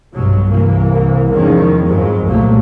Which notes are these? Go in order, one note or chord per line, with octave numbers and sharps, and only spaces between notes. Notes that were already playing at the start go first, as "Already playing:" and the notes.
B1 G2 B2 F#3
C2 E3 A#3
E2 G#2 D#3 F3 C#4
F2 G#2 F#3 G#3
C2 A#2 F#3 G3 A3 A#3